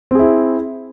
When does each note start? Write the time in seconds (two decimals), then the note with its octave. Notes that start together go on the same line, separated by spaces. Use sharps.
0.11 C4
0.15 G#4
0.19 E4